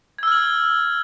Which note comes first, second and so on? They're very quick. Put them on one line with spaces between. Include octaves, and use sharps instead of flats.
G#6 E6 F6 F#7